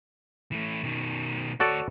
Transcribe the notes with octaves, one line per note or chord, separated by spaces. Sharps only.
E3 A3
B2 D#3
D2 F#4 A4 C#5 D5